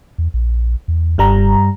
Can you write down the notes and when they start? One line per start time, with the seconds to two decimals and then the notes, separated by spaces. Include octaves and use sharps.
0.18 E2
0.34 A#1
0.88 E2
1.18 F#1 G2 G3 A#5